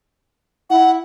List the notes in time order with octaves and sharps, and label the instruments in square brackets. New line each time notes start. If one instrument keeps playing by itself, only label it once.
[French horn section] E4 [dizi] F#5